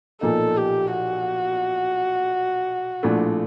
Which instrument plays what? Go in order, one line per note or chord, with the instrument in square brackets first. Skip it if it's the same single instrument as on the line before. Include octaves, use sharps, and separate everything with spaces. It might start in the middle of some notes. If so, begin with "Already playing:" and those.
[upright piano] B1 A#2 F3 A#3 D#4 [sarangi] A4
[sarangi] G4
F#4
[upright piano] A#1 A2 F3 A3 D4